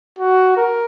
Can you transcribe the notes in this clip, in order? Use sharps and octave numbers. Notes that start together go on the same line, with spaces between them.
F#4
A#4